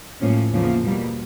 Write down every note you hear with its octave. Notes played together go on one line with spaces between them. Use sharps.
A2 F3 A#3 C#4
E2 C#3 F3 A#3
B2 G3 A#3